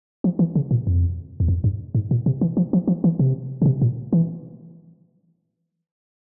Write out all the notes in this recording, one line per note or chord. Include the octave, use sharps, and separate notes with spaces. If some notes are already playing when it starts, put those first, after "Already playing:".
F3
E3
C#3
A#2
F2
E2
F2
G2
G#2
A#2
C3
E3
F3
F3
F3
E3
C3
C#3
C3
A#2
E3